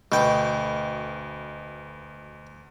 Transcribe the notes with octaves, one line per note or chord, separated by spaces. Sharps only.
D2 B2 G5